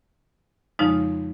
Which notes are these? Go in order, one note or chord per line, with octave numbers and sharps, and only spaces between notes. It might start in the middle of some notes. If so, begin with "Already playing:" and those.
F2 C#3 F3 G#3 D#4